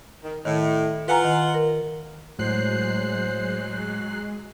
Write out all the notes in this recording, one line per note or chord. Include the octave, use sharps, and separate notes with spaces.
D#3
A2 D#3
F4 B4 F#5 G#5 A#5
D#3
A#4
A2 F#3 G#3 C5 F#6 C7